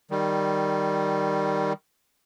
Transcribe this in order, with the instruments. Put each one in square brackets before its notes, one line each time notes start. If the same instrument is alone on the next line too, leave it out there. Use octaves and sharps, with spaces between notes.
[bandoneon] D#3 G3